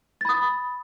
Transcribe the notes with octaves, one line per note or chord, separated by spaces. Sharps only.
B5 D#6 A6